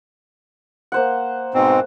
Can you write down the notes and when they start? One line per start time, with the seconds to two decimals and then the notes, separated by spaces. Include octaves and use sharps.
0.92 A#3 C5 F#5
1.54 G#2 B2 C4